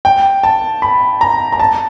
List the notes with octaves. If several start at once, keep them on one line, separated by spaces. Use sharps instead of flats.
G5
A5
B5
A#5
A#5
A5